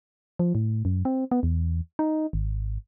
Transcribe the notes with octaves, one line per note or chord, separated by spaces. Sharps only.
F3
A2
F#2
C4
B3
E2
D#4
G#1